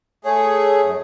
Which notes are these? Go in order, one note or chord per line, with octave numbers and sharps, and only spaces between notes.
A3 G#4 C#5
F#2